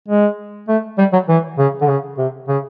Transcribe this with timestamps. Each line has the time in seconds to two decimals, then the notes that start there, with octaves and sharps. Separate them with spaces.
0.08 G#3
0.68 A3
0.98 G3
1.13 F#3
1.28 E3
1.58 C#3
1.81 D3
1.88 C#3
2.18 C3
2.48 C#3